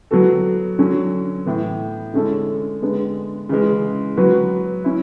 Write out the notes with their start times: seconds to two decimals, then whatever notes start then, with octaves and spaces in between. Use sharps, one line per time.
0.11 F#3 B3 F#4 A4
0.79 D3 F#3 C#4
1.46 A2 E3 B3
2.14 D3 G#3 C#4 E4 A4
2.82 D3 G#3 B3
3.49 C#3 E3 G#3
4.17 F#3 B3 F#4 B4
4.84 C#4 E4